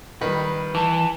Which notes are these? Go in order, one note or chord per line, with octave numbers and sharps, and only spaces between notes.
D#3 G3 B4
E3 A5